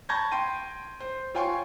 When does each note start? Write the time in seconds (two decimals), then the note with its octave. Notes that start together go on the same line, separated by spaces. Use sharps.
0.09 A5 B5 C#6 G6 G#6 A#6
0.32 G5 C6 D#7
1.00 C5
1.35 F4 C#5 G5 G#5 C6 C#6